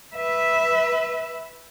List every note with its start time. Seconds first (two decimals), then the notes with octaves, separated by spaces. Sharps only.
0.16 B4 E5